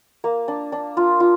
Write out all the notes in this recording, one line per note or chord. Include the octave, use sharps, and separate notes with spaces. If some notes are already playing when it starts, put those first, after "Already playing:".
A#3
D4
D4
F4
F4